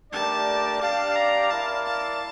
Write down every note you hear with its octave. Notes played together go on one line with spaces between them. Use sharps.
A3 D4 G4 A#4 D5 A5
D4 G4 D5 F5 A5
A#5
E4 A#4 D5 F5 A5
A5